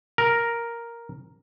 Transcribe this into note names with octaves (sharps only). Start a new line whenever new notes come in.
A#4